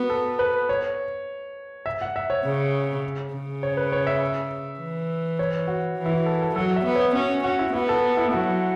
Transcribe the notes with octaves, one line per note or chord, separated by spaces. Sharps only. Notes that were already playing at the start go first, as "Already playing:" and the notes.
Already playing: B3 F#4
A4
B4
C#5
E5
F#5
E5
C#5
C#3
C#3
C#5
B4
C#5
E5
E3
C#5
F#4
E3
E4
F#4
A4
A4
F#3 A4
E5
B3
C#5
C#4 F#4
C#4 F#4
E4
B3 F#4
A4
E4
F#3 F#4